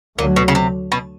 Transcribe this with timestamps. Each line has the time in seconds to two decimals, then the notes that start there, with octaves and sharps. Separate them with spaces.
0.18 D2 A#2 D3 F#3
0.36 B2
0.48 C#3
0.55 C3
0.92 B2